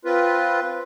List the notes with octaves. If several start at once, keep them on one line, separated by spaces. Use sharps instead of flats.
C4 F4 B4